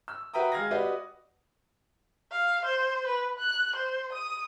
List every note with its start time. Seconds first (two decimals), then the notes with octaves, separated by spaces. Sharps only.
0.08 E6
0.34 F#4 B4 E5 G5 A#5 D#6
0.52 G#3 F5 G#6 A#6
0.71 F#4 G4 B4 D5 D#5
2.32 F5
2.64 C5
3.06 B4
3.39 F#6
3.75 C5
4.12 D#6